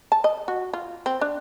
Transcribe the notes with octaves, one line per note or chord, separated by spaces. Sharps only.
A5
D#5
F#4
F4
C4
D4